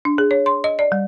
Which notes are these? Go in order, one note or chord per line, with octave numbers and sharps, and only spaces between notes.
D4
G#4
C#5
C6
D#5
D5
G3